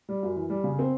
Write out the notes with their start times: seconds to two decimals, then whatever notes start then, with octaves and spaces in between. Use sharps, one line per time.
0.09 G3
0.23 F#2
0.35 E3
0.50 G3
0.64 C#3
0.79 C4